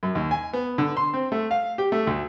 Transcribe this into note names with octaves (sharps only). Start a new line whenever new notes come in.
F#2
D#2
G#5
B3
D3
C6
C4
A3
F5
G4
A3
D2